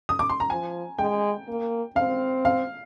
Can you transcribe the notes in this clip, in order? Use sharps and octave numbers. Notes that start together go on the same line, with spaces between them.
D#6
D6
C6
A#5
F3 G#5
G#3 G5
A#3
C4 F5
F5